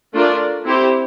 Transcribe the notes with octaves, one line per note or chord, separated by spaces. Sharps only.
A3 D4 F4 A#4 D5
C4 E4 G4 C5